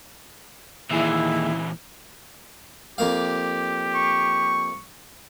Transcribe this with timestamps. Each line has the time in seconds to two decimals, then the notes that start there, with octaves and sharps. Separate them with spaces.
0.91 D#2 A#2 E3 E4 G#4 E5
2.98 F2 A#3 G4 F5
3.95 C#6